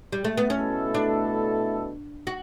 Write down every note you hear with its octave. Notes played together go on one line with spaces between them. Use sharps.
G3
A3
B3
B2 A3 C#4 E4 A4
D4
F#4